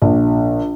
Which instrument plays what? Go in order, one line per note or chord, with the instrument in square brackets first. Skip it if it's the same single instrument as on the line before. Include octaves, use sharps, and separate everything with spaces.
[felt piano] A#1